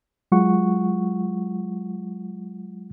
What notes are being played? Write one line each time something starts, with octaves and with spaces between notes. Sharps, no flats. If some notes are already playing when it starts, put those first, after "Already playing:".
F#3 G#3 F4 F#5 C#6